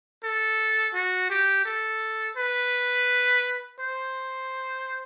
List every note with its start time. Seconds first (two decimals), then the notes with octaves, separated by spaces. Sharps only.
0.23 A4
0.94 F#4
1.30 G4
1.65 A4
2.37 B4
3.80 C5